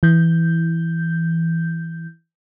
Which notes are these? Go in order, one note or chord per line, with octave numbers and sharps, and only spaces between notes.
E3 G6